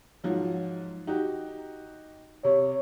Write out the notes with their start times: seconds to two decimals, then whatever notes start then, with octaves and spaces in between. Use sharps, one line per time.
0.24 G#2 F3 F#3
1.07 D#4 F#4 G4
2.44 C3 C#5